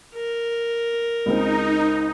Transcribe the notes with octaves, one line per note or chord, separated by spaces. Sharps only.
A#4
C#2 G#3 C4 D#4